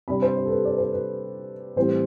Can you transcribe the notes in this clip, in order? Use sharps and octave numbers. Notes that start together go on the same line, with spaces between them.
C3 G3 D4 B5
C5
C5
A4
B4
D5
C5
B4
A2 E3 G3 C4 C5